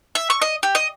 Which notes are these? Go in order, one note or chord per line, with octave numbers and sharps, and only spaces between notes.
E5
C#6
D#5
G4
D#5